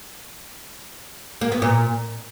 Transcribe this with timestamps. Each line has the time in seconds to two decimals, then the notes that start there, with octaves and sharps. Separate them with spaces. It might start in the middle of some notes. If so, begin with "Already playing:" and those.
1.41 A#3
1.52 B3
1.62 A#2